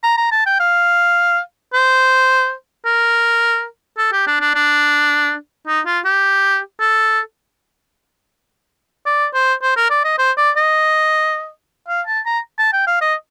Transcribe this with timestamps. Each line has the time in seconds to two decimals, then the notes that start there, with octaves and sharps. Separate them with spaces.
0.04 A#5
0.18 A#5
0.32 A5
0.46 G5
0.60 F5
1.73 C5
2.86 A#4
3.98 A4
4.13 G4
4.27 D4
4.41 D4
4.55 D4
5.67 D#4
5.86 F4
6.05 G4
6.81 A4
9.06 D5
9.34 C5
9.62 C5
9.77 A#4
9.91 D5
10.05 D#5
10.19 C5
10.38 D5
10.57 D#5
11.88 F5
12.07 A5
12.26 A#5
12.59 A5
12.73 G5
12.87 F5
13.01 D#5